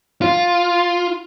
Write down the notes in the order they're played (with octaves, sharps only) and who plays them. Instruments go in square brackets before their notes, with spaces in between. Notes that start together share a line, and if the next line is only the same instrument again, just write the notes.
[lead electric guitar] F4